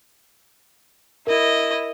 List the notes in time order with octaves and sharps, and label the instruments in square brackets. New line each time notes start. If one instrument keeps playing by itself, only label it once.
[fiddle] E4 D#5 [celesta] A#4